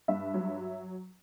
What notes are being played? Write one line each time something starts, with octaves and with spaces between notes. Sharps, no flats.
G2 E5
F#3